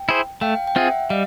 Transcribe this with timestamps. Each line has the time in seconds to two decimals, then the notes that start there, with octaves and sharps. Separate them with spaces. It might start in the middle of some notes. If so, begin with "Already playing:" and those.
Already playing: G5
0.09 E4 G#4 C5
0.41 A3 F5 G5
0.67 G5
0.76 C4 F4 G#4 E5 F#5
1.10 G3 D#5 F5